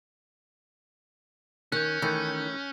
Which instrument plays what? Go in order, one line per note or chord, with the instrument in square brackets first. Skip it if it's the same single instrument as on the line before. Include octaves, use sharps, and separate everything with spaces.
[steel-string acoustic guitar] D#3 [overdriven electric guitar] C#4 [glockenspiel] F#6 G6
[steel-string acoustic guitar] D#3 [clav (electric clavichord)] E3 A3 D#4